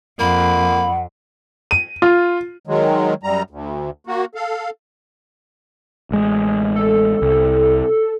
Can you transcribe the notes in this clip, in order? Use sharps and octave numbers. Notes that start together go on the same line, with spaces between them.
F2 A#3 F#5 B5
D#7
F4
D#3 F#3 G#3
F#2 G3 A#5
D2
A#3 F#4
A4 F5
A1 G#3
A4
C2